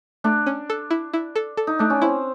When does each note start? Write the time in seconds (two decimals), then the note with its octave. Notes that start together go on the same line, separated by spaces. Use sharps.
0.24 A3 D4
0.47 C#4
0.70 A4
0.91 E4
1.13 E4
1.36 A4
1.57 A4
1.67 D#4
1.79 A3 D4
1.90 C#4
2.01 C4 E4